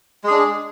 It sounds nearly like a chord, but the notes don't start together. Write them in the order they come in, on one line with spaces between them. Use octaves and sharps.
G#3 G#4 D4